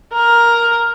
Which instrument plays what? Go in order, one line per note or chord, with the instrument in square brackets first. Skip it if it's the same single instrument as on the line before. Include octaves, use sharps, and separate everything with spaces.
[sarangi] A#4